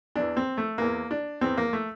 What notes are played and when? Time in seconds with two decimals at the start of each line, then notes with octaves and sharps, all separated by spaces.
0.15 E2 E3 D4
0.37 C4
0.57 A3
0.78 E2 E3 A#3
1.11 D4
1.41 E2 E3 C4
1.58 A#3
1.73 A3